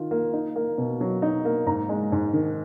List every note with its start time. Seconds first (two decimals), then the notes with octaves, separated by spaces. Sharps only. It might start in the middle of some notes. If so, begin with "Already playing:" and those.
Already playing: D#3 F4
0.11 A#3
0.33 D#4
0.56 A#3
0.78 B2
1.01 F#3
1.22 D#4
1.45 A#3
1.66 G#2 A#5
1.89 G#3
2.12 G#2
2.33 D#3